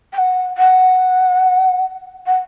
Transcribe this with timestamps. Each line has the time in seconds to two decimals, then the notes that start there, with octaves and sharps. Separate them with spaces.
0.13 G5
0.18 F#5
0.58 F#5
2.26 F#5